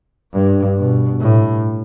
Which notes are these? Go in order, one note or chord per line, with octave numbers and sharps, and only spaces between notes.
G2
B2
A2